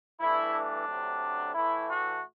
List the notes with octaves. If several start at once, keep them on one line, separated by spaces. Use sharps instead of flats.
G2 E3 A3 E4
D4
D2 C3 F#3
A2 E3 A3 E4
F#4